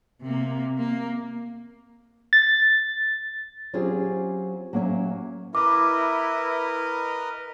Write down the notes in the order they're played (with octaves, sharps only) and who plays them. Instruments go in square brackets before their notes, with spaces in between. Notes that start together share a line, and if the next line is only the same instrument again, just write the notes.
[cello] C3 A#3
A#3
[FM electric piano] A6
[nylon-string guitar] F#3 C4 C#4 F4 G4 G#4
F#3 A#3 C#4 C#5 E5
[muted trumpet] E4 [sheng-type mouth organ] A#4 B4 D#5 [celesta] D6